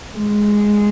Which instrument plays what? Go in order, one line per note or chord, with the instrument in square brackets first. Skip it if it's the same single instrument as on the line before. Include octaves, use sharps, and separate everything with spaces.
[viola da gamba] G#3